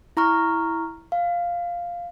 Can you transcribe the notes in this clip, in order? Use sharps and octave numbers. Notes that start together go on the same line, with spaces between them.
E4 A#5 C#6 F6
F5